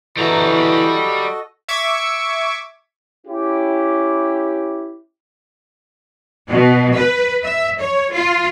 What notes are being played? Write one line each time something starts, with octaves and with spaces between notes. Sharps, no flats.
E3 G3 E4 F#4 A4 D#5 A#5
E5 C#6 D6 G#6
C#4 E4 G4
B2
B4
E5
C#5
F4